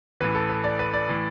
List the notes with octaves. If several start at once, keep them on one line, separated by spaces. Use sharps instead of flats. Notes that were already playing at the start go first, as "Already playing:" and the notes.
A1 A2 E3 B4
A4
B4
D5
B4
D5
A2 E3